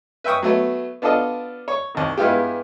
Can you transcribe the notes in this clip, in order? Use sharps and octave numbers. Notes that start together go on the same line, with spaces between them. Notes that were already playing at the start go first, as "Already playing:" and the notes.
B4 E5 G5 C#6 D#6
F#3 A3 B3
B3 D4 F4 A4 D#5
C#5
C2 D#3
G2 G#3 B3 E4 F4 G4